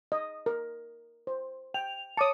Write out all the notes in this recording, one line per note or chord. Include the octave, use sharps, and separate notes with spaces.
D#5
A#4
C5
G5 F7
C#5 A5 D6 D#6 C#7